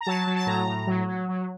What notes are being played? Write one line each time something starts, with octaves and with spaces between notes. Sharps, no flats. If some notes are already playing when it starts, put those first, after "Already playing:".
A#5
F#3 A5
F#3
A5
A2 A#5
A2
F#3
F#3
F#3